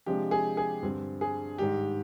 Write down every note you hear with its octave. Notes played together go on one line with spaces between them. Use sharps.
C3 F3 G#3 D4 G4
G#4
G#4
G2 D3 G3 C4
G#4
G#2 D#3 G3 G4